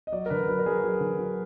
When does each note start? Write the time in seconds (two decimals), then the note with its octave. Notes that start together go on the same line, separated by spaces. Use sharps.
0.07 D#5
0.12 F#3 D5
0.26 A#4
0.30 D3 B4
0.48 F#3 B4
0.59 A#4
0.66 F#3 G#4
0.83 F#3
1.00 D3
1.18 F#3